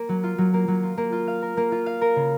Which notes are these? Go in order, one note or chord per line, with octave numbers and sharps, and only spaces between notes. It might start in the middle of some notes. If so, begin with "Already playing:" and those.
Already playing: A#3
F#3
F4
F#3
A#3
F#3
F4
A#3
F4
F5
A#4
A#3
F4
F5
A#4
C#3